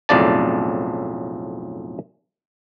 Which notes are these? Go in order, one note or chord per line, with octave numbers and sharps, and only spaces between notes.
B1 F2 A2 C#3 D5 A5